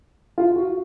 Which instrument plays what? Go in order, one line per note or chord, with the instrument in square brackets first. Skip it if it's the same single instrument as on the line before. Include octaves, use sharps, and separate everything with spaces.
[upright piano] F4
F#4